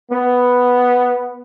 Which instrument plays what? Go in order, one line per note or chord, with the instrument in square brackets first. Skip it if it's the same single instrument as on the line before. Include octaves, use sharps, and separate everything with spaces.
[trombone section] B3